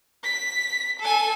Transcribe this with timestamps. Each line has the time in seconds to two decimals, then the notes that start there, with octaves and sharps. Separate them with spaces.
0.24 B6
1.00 A4 G#5